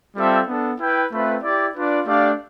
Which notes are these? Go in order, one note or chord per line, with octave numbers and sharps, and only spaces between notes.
G3 C4 F4 A4 E5
B3 D4 A4
E4 B4 E5 G5
A3 C4 F4 B4 E5
E4 G4 D5
D4 F4 B4 D5
A3 D4 G4 D5 F5